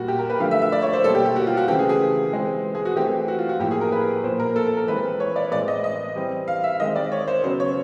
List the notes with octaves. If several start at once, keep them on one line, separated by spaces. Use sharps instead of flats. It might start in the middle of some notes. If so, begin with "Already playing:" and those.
Already playing: A#2 G3 A#3 F#4
G4
A#4
B4
D3 F3 A3 F5
E5
E5
D5
C#5
C5
B2 G3 A#3 A4
G4
G4
F#4
F4
F#4
C#3 E3 A3 C4 G4
G#4
G#4
E3 G#3 C4
G#4
F#4
E3 A3 C4 G4
F#4
F4
F#4
A2 F3 A#3 G4
G#4
A#4
B4
A#2 F3 A#3 C5
A#4
A4
A4
A#4
E3 G#3 C4 B4
C#5
D5
A2 E3 G#3 C4 D5
D#5
D#5
E3 G3 C4
F5
E5
D#3 G#3 C4 D#5
D5
C#5
C5
C#3 F#3 B3 C5
C#5